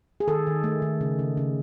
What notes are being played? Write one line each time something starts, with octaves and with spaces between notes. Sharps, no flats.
G#4
D#3 A4
D#3
A3
D#3
C#3
C#3
C#3